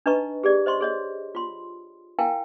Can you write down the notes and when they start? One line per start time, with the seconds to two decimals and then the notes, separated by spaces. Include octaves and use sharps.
0.06 D4 D#4 B4 D#5 A#5 C#6
0.44 G4 G#4 D5
0.66 C5 D#5 C6 C#6
0.81 G#4 C#5 D#5
1.35 F4 C6
2.19 E4 A#4 F5 G5 G#5